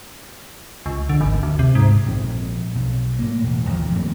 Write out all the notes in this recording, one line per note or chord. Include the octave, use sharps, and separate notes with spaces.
C#2
D3
G#1
D2
C3
G#2
A#1 C4
B1
A2 A#3
E1
A1 D#2 F3
F#2 A2 A#3 C4